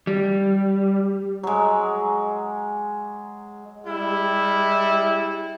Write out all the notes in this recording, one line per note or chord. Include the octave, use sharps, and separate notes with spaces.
G3
F#3 G#3
G3 G#3 E4